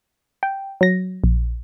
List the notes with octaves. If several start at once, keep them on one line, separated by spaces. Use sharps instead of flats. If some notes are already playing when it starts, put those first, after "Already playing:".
G5
F#3 A#6
A#1